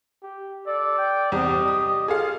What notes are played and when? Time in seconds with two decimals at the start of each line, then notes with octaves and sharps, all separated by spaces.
0.22 G4
0.66 A4 D5
0.98 G5
1.32 E2 G2 C3 G4 D#5
1.68 D#6
2.08 F4 G#4 A4 F5